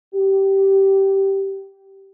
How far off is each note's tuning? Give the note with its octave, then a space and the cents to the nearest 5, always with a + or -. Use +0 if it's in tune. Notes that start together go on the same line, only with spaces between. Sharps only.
G4 -15